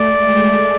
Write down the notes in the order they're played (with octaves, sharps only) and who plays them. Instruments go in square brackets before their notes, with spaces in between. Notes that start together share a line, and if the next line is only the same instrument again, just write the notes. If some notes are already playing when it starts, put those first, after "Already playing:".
Already playing: [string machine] A3 [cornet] D5
[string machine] G#3